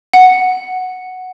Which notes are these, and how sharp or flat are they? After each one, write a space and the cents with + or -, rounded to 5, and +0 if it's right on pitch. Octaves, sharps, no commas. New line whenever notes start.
F#5 +0